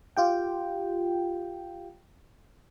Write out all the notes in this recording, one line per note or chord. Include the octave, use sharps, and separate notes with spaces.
F4 G4 G5